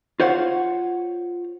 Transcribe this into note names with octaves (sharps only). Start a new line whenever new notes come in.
F4 C5 C#5 F5 F#5